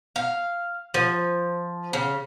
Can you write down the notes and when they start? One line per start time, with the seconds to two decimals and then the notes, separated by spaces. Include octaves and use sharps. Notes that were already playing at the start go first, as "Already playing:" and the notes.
0.16 F5
0.94 F3
1.93 C#3